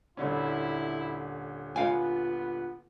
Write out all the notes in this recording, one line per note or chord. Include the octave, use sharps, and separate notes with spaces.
D#1 D3 C#4 E4
B3 F4 F5 G#5